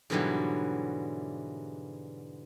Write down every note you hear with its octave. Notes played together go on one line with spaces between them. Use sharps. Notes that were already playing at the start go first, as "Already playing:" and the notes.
G#2 B2 D3 E3 F#3 G3